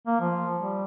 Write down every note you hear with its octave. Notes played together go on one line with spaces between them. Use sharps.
A#3
F3
G3